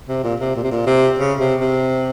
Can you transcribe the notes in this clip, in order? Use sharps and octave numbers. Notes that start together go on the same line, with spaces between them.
C3
A#2
C3
A#2
C3
A#2
C3
C#3
C3
C3